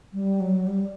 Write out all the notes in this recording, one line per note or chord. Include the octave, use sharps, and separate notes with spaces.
G3
F#3
G3